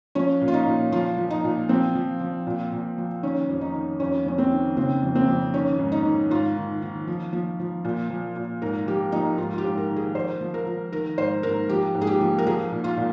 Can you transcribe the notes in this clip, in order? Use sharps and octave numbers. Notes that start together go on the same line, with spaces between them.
F3 C#4
A#2
F4
D#4
A#2
F3 F4
F3
D#4
A#2
F3 C4
F3
F3
A#2
A#2
F3
D#3 C#4
F2
D#4
D#3
F2 C#4
F2 C#4
C4
D#3
C#3 C4
F2
C4
F2
D#3 C#4
G#2
D#4
D#3
G#2 F4
D#3
D#3
F3
F3
F3
A#2
F3
A#2
G#2 A#4
F3 G4
F3 D#4
G#2 F4
F4
G4
G#2
A#4
D#3
G#4
F3 C5
F3
A#4
F3
D#3 A#4
G#2 C5
G#2 A#4
F3 G4
G#2
G#4
G4
F3
A#4
F3 G#4
A#2
F4
A#2